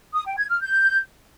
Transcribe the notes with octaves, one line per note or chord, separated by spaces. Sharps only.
D#6
G5
G#6
F6
G6